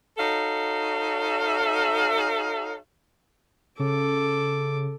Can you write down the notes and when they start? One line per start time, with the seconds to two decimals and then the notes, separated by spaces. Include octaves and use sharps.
0.18 D#4 F#4 A4 C#5 F5
3.79 C#3 A4 D6